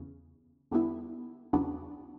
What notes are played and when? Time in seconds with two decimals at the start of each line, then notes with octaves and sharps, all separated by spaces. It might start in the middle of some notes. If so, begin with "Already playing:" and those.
Already playing: E2 C#3
0.71 E2 D3 G3 B3 E4
1.53 E2 C#3 F#3 B3 D4